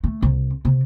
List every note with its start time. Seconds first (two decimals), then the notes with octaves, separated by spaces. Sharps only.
0.04 A3
0.22 C2
0.65 C3